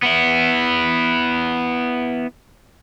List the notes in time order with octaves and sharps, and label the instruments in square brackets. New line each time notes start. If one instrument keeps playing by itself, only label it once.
[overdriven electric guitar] B3 E4